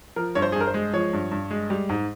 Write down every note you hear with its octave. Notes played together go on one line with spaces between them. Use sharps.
F3 A#4
G2 C#5
C5
G#4
G2
A#4
C5
G#3
F3 C#5
G2
G2
G#3
G3
G#2